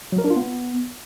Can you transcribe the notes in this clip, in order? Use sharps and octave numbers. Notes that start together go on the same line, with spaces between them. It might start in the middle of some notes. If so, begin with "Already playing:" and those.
F#3
A#4
D4
F4
B3